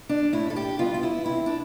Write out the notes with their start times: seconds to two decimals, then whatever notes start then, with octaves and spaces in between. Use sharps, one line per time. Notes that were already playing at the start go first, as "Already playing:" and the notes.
0.09 D4
0.32 A2 E4
0.50 A4
0.56 G4
0.79 G3 B3 F4
0.94 F4
1.03 E4
1.26 C3 E4
1.46 D4